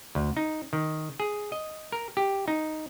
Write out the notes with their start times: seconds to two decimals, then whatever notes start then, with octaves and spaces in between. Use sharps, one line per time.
0.15 D2
0.37 D#4
0.73 D#3
1.20 G#4
1.52 D#5
1.92 A#4
2.17 G4
2.48 D#4